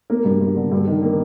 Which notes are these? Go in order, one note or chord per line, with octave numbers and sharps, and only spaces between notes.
A#3
G2
G2
D3
G2
D#3
A#3